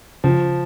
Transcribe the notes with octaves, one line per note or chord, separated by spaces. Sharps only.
C#3 F3